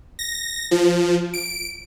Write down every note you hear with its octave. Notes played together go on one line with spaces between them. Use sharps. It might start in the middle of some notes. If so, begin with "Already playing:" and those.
A#6
F3
D7